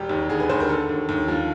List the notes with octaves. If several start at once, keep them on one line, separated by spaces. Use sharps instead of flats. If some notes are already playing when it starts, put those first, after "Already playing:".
Already playing: E1 G4
D#2
D3 G#4
B4
D#2 C5
A#4
D3 A4
D#2
D#2
F3